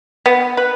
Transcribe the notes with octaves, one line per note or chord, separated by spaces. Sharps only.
B3
B4